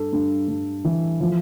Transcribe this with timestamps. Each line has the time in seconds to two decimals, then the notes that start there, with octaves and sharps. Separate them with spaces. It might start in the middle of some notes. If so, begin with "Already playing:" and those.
Already playing: G2 A4
0.13 G2
0.48 G2
0.84 E3
1.21 F3